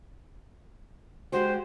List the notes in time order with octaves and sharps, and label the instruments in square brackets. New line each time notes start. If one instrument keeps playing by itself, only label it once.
[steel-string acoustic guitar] G#3 F#4 G4 [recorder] C5